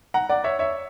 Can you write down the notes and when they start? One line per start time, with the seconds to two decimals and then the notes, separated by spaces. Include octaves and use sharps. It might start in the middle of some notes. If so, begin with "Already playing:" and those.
0.14 F#5 A#5
0.30 D5 F#5
0.44 C#5 E5
0.59 C#5 E5